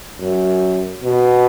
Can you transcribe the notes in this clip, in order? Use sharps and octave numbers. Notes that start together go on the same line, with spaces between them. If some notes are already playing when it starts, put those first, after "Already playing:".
F#2
B2